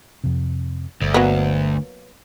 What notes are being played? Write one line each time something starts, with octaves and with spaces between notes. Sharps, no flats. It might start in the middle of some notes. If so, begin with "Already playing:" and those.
F2 C3
G1 D2
F#3 A#3 B3